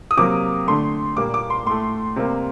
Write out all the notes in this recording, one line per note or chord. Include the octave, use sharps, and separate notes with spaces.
D#6
C3 F#3 A#3 D6
D3 A3 C6
A#2 G3 A#3 D6
D6
C6
A2 A3 C6
C3 G3 A#3